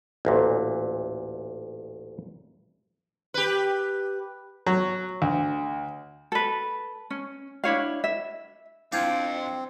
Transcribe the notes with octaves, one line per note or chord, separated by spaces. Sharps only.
A1 D2 A#2
G4 B4
F#3
D2
A4 B4
C#4
D4 E4 C#5 F5
E5
C4 D4 E4 F4 F5 G5 G6 G#6